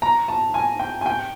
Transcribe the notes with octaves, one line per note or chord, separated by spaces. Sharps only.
A#5
A5
G#5
G5
G#5
G5